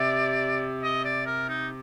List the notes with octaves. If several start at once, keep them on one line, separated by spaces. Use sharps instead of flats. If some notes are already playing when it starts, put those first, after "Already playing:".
Already playing: C3 D5
D#5
D5
A#4
D#4